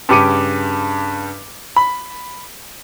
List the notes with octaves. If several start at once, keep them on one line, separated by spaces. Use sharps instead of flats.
G2 C#3 G4 D6 C#7 D#7
B5